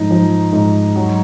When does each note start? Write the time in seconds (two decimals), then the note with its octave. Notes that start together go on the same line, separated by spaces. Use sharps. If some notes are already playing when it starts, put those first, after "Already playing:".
Already playing: G#2 F3 D#4
0.11 F3
0.53 G#2
0.96 F#3